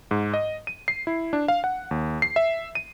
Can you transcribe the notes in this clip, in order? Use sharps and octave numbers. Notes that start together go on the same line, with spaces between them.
G#2
D#5
D#7
C7
E4
D4
F5
F#5
D#2
C7
E5
D#7